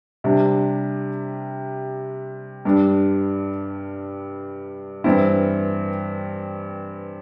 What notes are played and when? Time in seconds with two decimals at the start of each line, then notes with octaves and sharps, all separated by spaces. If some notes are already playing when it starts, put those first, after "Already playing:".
0.24 C3 G3 D4
2.65 G2 G3 D4
5.04 G2 E3 C4 E4